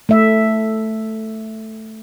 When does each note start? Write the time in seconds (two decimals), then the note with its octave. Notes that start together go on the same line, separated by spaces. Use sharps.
0.09 A3 E5